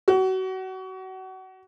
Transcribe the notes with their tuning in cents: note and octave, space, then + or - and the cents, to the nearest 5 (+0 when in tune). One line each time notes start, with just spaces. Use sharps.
F#4 +30